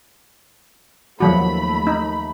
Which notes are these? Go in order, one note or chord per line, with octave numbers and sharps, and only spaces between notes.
D#2 F3 F#3 A3 F#4 B5
D#4